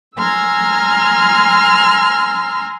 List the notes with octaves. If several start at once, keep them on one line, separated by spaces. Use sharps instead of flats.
G#5 A#5 C6 E6 F6 G#6